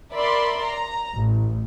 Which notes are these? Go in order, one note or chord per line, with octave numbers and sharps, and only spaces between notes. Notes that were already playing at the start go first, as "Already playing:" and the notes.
A#4 D5 E5 B5 C6
A#5
A1